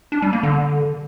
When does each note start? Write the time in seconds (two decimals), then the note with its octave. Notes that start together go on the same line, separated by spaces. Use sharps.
0.12 D4
0.22 G3
0.33 A#3
0.43 D3